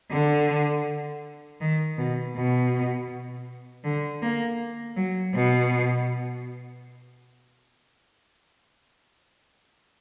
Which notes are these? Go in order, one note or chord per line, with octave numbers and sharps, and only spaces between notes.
D3
D#3
B2
B2
D3
A#3
F#3
B2